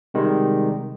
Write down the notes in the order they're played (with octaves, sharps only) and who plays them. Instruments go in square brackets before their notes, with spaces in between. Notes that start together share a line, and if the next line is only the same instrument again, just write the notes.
[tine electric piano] C3 D#3 G3 G#3